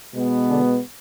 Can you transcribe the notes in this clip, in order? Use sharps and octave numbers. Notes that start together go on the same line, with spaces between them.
B2 G#3 B3
D3 D4